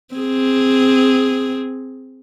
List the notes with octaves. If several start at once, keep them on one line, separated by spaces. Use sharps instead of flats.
C4 G#4